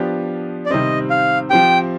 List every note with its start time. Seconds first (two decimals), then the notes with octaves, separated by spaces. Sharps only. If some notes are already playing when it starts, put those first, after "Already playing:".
Already playing: F3 B3 D4 G4
0.66 D5
0.70 C3 D#3 G3 C4 D#5
1.10 F5
1.50 F3 C4 G4 G5